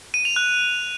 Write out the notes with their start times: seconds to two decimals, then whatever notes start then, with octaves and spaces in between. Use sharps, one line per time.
0.14 D#7
0.25 F7
0.36 F#6